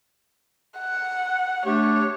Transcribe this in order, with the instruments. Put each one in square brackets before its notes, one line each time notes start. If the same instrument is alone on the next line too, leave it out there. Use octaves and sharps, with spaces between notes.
[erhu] F#5
[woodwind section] A3 D4 G4 [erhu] C#5